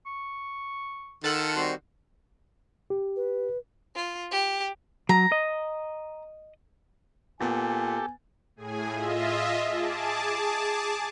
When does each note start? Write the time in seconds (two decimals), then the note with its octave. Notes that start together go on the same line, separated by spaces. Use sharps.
0.06 C#6
1.24 D#3 F4 A4 F#5
1.56 G3 C4 F#4 C6
2.90 G4
3.16 B4
3.95 F4
4.31 G4
5.09 F#3 A#5
5.32 D#5
7.40 A#2 B3 G4 A4 G#5 A6
8.56 A2 G#4 G#5
8.91 F4 D#5 E5
9.68 G#4 A5 D6